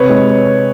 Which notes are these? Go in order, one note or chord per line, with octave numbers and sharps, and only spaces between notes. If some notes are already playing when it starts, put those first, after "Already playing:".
Already playing: C3 B4 C#5
G#3